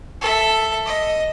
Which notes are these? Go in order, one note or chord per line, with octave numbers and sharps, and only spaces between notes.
A4 E5
D#5